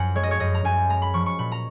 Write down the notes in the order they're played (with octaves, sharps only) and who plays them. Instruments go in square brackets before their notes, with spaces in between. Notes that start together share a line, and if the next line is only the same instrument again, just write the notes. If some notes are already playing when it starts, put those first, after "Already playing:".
Already playing: [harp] F#2 F3 F#5 G#5
G#3 C#5
D#5
C#5
F#2 D#5
A#5
F#2 G#5
G#3 A#5
B5
F3 C#6
C#6
A#2 B5
A#5